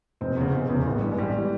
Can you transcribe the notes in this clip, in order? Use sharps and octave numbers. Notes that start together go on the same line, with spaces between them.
F1 C4
E2 C#3
F1
E2 C#3
A1 B3
G3
G2 E3
G#3
A1 G3
E3